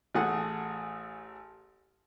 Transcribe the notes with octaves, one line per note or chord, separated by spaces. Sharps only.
A1 A3 G#4 F#5